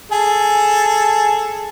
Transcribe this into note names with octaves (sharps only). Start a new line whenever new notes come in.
G#4 A4